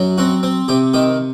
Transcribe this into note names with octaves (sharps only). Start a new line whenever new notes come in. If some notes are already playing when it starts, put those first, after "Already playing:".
Already playing: F#2 F#3
C4 F#4
C4
C3 G4
D#3 G4